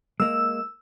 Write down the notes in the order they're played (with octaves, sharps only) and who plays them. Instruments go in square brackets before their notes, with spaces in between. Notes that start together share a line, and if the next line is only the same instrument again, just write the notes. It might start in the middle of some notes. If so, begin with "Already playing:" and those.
[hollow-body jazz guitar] G#3 A#3 [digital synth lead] E6